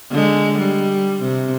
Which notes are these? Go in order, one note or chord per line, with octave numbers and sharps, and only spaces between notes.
D3 G#3
G3
C3